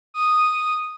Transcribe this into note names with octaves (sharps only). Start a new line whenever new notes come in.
D#6